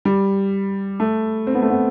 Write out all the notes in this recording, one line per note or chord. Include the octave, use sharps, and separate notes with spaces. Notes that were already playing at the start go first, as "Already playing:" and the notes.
G3
A3
C4
B3
A3
B3